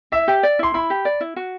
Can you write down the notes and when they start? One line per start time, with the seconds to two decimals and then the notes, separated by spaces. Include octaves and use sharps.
0.12 E4 E5
0.28 G4
0.43 D5
0.59 E4 C6
0.74 E4 B5
0.90 G4
1.05 D5
1.21 E4
1.36 F#4